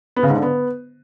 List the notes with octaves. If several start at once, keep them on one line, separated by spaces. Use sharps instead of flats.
B3
C#3
G#2
D3
B3